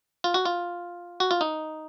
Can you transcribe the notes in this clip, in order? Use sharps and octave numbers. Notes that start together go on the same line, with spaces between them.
F4
F#4
F4
F#4
F4
D#4